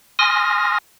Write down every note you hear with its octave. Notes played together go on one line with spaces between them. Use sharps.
G#5 C6 D#6 F6 A#6